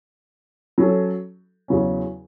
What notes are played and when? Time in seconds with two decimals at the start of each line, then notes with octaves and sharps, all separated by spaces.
0.78 F#3 C#4 A4
1.68 E2 C#3 F#3 C#4